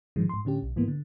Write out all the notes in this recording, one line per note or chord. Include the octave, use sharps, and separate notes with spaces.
G#2 D3 D#3 F3 G#3
G#2 C6
A2 D3 C#4 G4
B1
G#2 E3 A#3 B3
D3